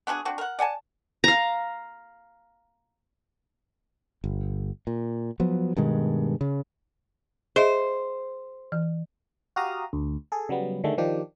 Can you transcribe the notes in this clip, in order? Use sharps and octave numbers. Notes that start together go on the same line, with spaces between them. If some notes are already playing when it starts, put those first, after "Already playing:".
B3 D4 F#4 G#4
C4 D4 F#4
A#4 F#5
D5 F#5 G#5 A5
F5 A#5
G1
A#2
F3 F#3 B3
G2 B2 D#3 G#3
C#3
G#4 C5 D#5 E5
E3
F#4 G4 F5 A#5 D#6
D2
G#4 A4
C#3 F#3 G3 B3
D3 D#3 G#3 A3
D#3 F3 D4 G4